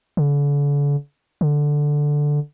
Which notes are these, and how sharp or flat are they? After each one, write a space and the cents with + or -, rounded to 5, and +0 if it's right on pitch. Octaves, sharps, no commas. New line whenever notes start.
D3 -40
D3 +0